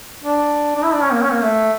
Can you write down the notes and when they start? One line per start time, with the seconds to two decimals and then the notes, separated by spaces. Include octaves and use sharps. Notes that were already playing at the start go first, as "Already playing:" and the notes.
0.23 D4
0.76 D4
0.83 E4
0.93 D4
1.02 C#4
1.13 A#3
1.22 C#4
1.32 A#3
1.42 A3